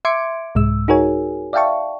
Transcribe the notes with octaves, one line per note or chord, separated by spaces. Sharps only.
E5 C6 D6 G#6 C#7 D7
C2 G#2 G#3 E6
D#4 F#4 G#4 A#4 C#5 G#5
D5 E5 F5 G5 A5 C#6